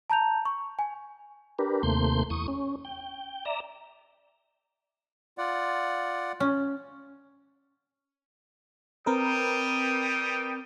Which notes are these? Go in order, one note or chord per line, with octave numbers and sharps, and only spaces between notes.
A5 A#5 G6 F7
C#6
G#5
D4 G4 A#4 B4
D#2 C3 A3 A#3 C6 G6
E2 C#6 D#6
C#4
G5
D5 E5 A#5
F4 D5 F#5
C#4
G3 C4 A#4 B4 G5 D#6